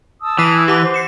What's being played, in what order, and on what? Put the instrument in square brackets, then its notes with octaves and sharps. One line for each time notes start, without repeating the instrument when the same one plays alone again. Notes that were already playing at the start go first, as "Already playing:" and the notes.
[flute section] A5 D#6 E6
[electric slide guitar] E3 [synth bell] F#6 B6 C7
[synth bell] G4 F#5 D6 [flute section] A5
[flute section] C5
[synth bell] C7 C#7 E7